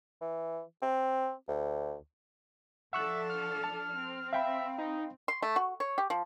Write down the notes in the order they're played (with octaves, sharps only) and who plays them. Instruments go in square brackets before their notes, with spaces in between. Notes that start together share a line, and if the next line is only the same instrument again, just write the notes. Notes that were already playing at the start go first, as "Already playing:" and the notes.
[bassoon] E3
C4
D2
[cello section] F3 D4 A4 [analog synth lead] E5 [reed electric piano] F#5 C#6 F#6
[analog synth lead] F6
[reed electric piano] A5
[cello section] C4 [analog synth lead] F6
[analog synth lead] E5 [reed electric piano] F5 G5 B5
[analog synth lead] D#4
[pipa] C6
A3
F#4
C#5
G4
F3